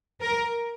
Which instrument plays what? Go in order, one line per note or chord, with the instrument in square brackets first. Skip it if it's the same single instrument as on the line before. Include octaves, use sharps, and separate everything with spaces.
[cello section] A#4